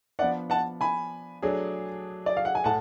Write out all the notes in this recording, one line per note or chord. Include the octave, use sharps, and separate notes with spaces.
F3 B3 D4 D5 F#5
F#5 A5
G#5 B5
F#3 A3 D4 G#4
D5
F5
F#5
G#5
A2 F#5 A5